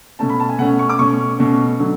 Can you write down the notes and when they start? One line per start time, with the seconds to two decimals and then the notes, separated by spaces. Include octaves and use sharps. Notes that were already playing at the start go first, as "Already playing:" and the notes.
0.19 B2 A3 C#4 A5
0.30 B5
0.40 A5
0.49 G#5
0.59 B2 A3 C#4 F#5
0.79 C#6
0.89 D6
0.99 B2 A3 C#4 C#6
1.39 B2 A3 C#4
1.79 D3 F#3 A3